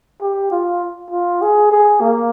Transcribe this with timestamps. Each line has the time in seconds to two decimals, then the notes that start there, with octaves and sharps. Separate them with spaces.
0.22 G4
0.51 F4
1.11 F4
1.41 G#4
1.72 G#4
2.01 A#3